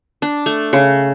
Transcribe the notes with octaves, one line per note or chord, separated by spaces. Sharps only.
D4
A3
C#3